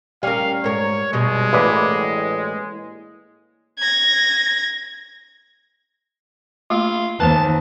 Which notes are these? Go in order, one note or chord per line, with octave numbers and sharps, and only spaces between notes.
G3 C#4 A#4 F5
G#2 A#4 C#5
G2 B2 G3 G#3
A1 A#3 E4 B4 D5
G#6 A#6
A3 A#3 F4
D#2 B4 C5 A5